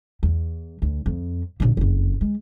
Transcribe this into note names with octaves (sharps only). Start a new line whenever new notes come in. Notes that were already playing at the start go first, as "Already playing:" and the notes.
E2
D2
F2
A#1 D3
F#1 F2
G#3